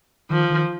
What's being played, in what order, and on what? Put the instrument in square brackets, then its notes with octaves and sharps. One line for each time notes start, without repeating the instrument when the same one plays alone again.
[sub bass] D#3 [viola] F3
[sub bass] D#3